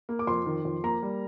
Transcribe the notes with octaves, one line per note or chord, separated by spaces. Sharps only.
A#3
D6
F2 C6
D#3
F2
A#3 A#5
G3